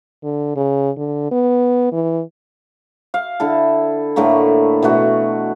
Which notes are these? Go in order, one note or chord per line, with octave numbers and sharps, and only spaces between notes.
D3
C#3
D3
B3
E3
F5
D3 E4 A4
A2 D3 A3 A#3
B2 E3 A3 F#4